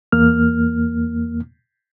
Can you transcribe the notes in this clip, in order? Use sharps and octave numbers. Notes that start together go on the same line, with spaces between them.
E2 A#3 F6